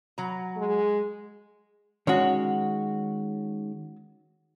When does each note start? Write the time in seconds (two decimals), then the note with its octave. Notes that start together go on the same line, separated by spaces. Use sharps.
0.18 F#3 A#5
0.57 G#3
2.07 D#3 G#3 C#4 F#4 C#5